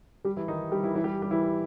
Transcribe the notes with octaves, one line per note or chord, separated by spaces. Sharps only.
G3 G4
E3 E4
D#3 D#4
G3 G4
E3 E4
E3 E4
G3 G4
G3 G4
E3 E4